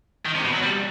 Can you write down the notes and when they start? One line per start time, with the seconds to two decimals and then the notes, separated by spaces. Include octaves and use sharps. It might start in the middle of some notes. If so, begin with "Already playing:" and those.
0.26 D#3
0.35 C3
0.44 B2
0.53 F#3
0.63 G3